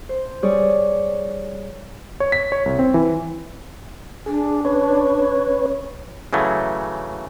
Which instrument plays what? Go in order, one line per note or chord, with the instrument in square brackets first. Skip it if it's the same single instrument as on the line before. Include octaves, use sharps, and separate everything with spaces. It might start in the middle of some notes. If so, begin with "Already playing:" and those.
[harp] C5
G3 G#4 C#5 D5
[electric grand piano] C#5
B6
C#5
C2
C4
E3
[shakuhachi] D4 [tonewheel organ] G#4
[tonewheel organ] C#4 B4 C#5
[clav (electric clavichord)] C#3 E3 F#3 A3